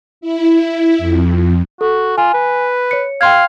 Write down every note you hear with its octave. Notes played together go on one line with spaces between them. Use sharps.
E4
F2
F#4 A4
F4 G#5
B4
C#5 C#7
F5 G5 C6 G#6